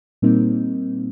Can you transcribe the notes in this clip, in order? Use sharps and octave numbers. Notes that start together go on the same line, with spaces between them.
A#2 G3 A#3 C4 D#4